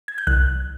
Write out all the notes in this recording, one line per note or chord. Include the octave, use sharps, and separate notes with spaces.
G#6
G6
C2 F#6